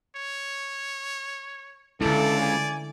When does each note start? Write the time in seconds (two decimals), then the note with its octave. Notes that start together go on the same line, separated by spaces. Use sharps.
0.16 C#5
2.01 C#2 D3 E4 A4 D5
2.40 G#5